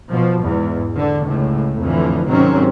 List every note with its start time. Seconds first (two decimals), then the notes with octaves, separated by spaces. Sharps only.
0.10 B2 F3
0.43 E2 G#2
0.95 D3
1.25 C#2 A2
1.81 F2 A2 D3 E3 F3
2.28 G#2 C3 D#3 F#3 C4 C#4